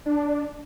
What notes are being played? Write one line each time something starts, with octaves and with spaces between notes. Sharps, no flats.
D4